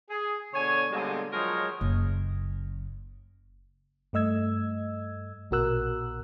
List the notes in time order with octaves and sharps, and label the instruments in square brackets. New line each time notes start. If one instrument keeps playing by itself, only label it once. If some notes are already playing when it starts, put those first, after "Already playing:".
[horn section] G#4
B2 D3 C#5 G#5
B2 D3 G3 G#3 A#3 C4
F3 F#3 G#3 A#4 C#5 D#5
[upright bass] F#1
[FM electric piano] G2 A3 D#5 E6 G#6
A#1 B2 F#4 A#4 E6 F#6